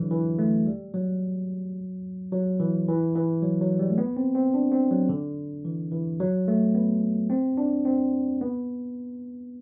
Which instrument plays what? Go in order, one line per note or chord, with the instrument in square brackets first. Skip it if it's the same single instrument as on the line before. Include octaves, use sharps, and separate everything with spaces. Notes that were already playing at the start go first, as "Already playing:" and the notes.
Already playing: [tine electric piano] D3 E3 F#3
E3
A3
G3
F#3
F#3
E3
E3
E3
F#3
F#3
G3
A3
B3
C4
C4
D4
C4
F#3
D3
E3
E3
F#3
A3
B3
C4
D4
C4
B3